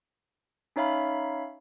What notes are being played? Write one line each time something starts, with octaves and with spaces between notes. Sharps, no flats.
C#4 D#4 C#5 E5 F5 B5